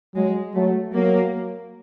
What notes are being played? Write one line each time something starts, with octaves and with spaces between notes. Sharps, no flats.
F#3 G#3
F#3 A3
F#3 A#3